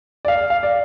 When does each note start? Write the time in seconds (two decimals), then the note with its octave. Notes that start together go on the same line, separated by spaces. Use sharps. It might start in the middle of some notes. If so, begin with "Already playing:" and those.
0.25 D5
0.28 F5
0.50 F5
0.63 D5